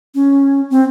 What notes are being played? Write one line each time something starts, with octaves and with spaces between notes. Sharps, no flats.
C#4
C4